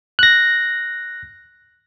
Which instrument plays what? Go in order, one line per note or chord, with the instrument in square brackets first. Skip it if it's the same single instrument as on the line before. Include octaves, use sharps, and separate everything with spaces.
[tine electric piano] F#6 A#6